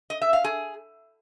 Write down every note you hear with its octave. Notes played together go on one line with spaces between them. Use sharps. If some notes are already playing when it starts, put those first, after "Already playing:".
D#5
E5
F5
G#4